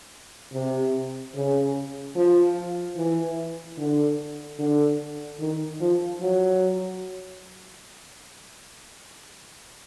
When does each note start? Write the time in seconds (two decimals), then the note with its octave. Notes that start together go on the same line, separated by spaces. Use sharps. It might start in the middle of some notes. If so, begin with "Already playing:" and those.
0.53 C3
1.34 C#3
2.15 F3
2.96 E3
3.78 D3
4.59 D3
5.40 D#3
5.81 F3
6.22 F#3